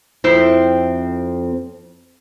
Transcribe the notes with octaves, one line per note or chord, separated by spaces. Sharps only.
F2 C4 E4